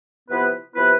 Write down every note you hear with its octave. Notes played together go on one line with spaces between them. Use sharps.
C3 F3 B3 E4 B4
C3 F3 B3 E4 B4